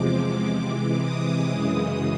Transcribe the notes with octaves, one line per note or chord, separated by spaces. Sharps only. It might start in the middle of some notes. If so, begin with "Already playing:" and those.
Already playing: E2 C3 F3 G#3 D6
C3 E3 G#3
D#6
F#2 C#3 E3 G#3